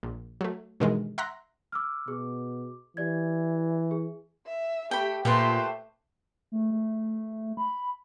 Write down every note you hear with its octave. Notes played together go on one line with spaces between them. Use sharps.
A#1
F#3 A3
G2 B2 D#3 E3 G#3
E5 F#5 A#5 C6 F#6 A#6
D6 E6 F6
B2 G#4 D6
E3 G4 D5 G#6
G#4
E5
A3 G4 G5 B5
A#2 A3 G4 B4 C5 C6
A3
A3
B5